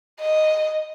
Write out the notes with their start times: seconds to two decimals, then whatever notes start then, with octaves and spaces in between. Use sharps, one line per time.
0.20 D#5